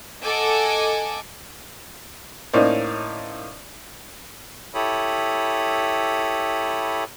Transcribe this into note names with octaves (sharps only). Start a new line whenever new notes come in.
A4 D#5 F#5 G#5 D6 E6
A2 A#3 C#4 D#4 C5 D5
E4 G4 A4 C#5 B5 D#6